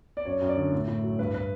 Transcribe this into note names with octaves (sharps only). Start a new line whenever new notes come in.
D5
F#2 C#5
F#2
D5
D3
A2
A2
F#3
G2 B4
B4